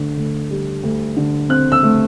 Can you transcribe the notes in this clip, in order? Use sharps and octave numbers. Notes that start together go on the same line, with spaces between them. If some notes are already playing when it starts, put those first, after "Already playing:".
Already playing: D2 D3
D2
G3
D2
D3
C4 F#6
E6
A3